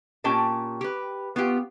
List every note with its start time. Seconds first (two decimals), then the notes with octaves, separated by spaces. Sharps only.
0.24 A#2 C#4 G4 G5 A5
0.81 G4 B4
1.36 B3 F4 G4